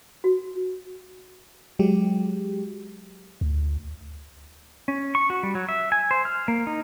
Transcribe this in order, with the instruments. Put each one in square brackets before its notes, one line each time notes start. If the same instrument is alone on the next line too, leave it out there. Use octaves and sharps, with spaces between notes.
[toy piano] F#4
[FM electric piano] F#3 G#3 G4
[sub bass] D2
[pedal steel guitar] C#4
C#6
F#4
G3
F#3
E5
G#5
C5
F6
A#3
D#4